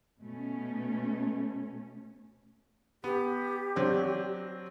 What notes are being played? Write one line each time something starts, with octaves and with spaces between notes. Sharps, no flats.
B2 A3 C#4
B3 G4
F#3 C4 D4